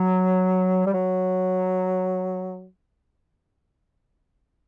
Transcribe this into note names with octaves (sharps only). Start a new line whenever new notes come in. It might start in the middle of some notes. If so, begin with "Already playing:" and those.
Already playing: F#3
G3
F#3